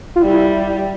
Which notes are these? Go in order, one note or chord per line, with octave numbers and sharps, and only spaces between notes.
F4
G3 E4